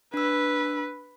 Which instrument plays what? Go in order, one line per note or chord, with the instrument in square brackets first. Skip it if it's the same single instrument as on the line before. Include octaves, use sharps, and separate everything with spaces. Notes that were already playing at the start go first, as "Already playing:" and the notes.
[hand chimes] D4 E6 [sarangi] B4